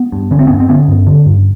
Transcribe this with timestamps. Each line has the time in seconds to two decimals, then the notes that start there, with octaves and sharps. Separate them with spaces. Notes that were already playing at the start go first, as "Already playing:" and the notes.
Already playing: B3
0.12 G2
0.31 D3 C#4
0.39 C4
0.47 G2 B3 C#4
0.60 C4
0.69 D3 B3 C#4
0.88 G2
1.07 D3
1.26 G2